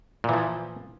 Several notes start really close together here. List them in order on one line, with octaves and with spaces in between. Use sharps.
A#2 E3 F3